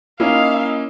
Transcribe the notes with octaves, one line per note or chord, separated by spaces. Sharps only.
A#3 C#4 D#4 E4 D#5 F5 D#6